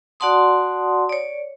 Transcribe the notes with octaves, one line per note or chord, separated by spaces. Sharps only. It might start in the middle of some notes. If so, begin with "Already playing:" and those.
F#4 D5 F#5 A5 C6 D#6
C#5 D5